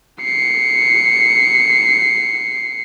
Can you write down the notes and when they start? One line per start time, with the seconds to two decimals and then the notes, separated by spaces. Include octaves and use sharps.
0.22 C7 C#7